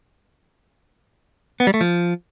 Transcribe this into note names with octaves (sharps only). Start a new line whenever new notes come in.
B3
G3
A3
F3